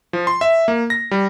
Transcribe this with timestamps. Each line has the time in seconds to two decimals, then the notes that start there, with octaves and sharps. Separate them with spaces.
0.13 F3
0.27 C6
0.41 E5
0.68 A#3
0.90 A#6
1.11 G3